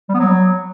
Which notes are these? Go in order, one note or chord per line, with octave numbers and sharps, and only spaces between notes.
G3
B3
F#3